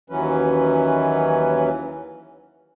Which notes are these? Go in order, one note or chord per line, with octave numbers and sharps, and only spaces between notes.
D#2 E3 F#3 C#4 B4